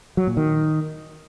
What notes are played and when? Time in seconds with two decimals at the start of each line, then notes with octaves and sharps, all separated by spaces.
0.17 F#3
0.27 A#2
0.37 D#3